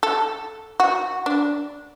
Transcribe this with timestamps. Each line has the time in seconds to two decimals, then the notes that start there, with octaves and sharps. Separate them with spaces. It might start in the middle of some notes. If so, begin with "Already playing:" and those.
0.03 A4
0.80 F#4
1.26 D4